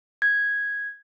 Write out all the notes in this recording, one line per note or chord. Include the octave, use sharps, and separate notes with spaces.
G#6